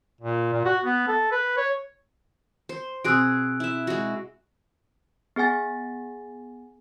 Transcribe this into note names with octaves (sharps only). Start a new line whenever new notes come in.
A#2
A#2
F#4
B3
A4
B4
C#5
C5
B2 C4 F#4 G#4 D#6 E6 F#6 D7
E4 E5
G#3 F#4
B3 G#4 F#5 G#5 A6